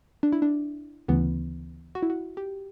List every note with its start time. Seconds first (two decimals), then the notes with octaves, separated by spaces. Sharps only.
0.23 D4
0.32 E4
0.42 D4
1.08 D2 C#3 E3 B3
1.95 F#4
2.03 E4
2.10 F#4
2.37 G4